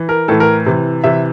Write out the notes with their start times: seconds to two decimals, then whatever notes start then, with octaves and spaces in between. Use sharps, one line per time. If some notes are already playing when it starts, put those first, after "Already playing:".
Already playing: E3
0.09 A#4
0.28 A2 E3 A4
0.40 A#4
0.66 C3 E3
1.04 C3 E3 E5